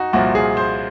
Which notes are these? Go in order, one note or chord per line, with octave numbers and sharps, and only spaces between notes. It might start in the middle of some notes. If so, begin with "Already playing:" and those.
Already playing: D#4 F#4
C2 A#2 F3 F#4
G#4
C5